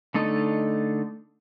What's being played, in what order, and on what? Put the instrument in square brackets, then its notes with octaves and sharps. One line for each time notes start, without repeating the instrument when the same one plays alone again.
[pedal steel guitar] D3 A3 D#4 A4 D#5